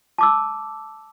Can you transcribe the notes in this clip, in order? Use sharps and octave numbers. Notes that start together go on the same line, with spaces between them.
A5 D6 E6